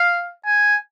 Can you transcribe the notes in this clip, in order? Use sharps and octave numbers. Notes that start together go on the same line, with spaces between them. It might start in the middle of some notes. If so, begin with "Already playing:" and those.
Already playing: F5
G#5